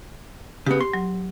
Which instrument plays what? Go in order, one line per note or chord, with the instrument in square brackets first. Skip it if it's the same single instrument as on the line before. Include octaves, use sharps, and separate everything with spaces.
[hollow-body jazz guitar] C#3 B3 [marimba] G4
[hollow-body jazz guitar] C6
[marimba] F#3